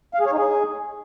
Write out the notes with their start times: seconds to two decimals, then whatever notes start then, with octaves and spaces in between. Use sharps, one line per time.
0.14 F5
0.20 G#4
0.26 C#5
0.32 D#4
0.38 G#4